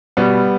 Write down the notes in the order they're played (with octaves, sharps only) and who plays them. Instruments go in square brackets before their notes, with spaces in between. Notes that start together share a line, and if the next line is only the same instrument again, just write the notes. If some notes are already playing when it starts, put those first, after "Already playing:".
[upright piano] B2 G3 B3